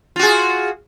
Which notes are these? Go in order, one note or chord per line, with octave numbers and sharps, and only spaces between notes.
F4 F#4 G#4